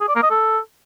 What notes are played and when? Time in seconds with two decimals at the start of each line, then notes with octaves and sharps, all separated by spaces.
0.01 G#4
0.08 D5
0.16 A#3
0.23 D#5
0.30 A4